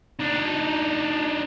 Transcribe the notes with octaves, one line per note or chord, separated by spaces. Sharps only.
D4 D#4